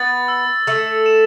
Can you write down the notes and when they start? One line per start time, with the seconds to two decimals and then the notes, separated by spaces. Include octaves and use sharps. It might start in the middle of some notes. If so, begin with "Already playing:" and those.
Already playing: B3 B4 A6
0.28 E6
0.67 A3 A4 E6
1.06 E7